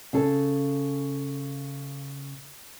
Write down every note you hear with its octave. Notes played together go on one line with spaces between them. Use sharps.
C#3 A4